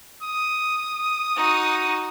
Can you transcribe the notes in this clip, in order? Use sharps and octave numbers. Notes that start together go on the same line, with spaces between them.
D#6
D#4 F#4